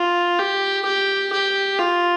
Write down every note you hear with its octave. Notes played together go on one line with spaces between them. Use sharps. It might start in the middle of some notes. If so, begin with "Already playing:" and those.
Already playing: F4
G4
G4
G4
F4